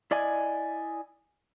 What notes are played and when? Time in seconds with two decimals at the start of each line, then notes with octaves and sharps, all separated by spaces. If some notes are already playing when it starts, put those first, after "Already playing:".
0.11 E4 D5 D#5 G#5